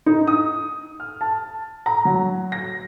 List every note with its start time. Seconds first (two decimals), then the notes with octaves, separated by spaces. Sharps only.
0.06 D#4
0.27 D#6
1.00 F6
1.21 A5
1.86 A#5
2.05 F#3
2.52 A#6